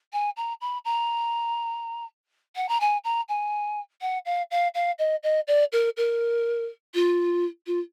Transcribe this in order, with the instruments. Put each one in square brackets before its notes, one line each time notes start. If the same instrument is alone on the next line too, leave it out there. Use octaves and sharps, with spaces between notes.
[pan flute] G#5
A#5
B5
A#5
F#5
A#5
G#5
A#5
G#5
F#5
F5
F5
F5
D#5
D#5
D5
A#4
A#4
F4
F4